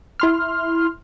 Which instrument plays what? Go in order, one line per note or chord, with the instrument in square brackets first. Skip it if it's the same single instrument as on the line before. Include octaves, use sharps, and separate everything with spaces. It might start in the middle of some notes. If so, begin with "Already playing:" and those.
[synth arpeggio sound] E4 C6 F6